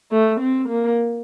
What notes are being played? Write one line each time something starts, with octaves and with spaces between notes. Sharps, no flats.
A3
C4
A#3